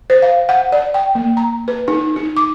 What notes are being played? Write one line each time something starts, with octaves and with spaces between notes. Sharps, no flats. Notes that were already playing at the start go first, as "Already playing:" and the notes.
C5
F5
F#5
D5
G5
A#3
A#5
B4
D#4
D#4
D6